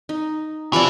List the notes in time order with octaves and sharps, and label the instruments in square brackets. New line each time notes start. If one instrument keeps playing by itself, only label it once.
[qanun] D#4
[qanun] C3 F3 D5 [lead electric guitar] E3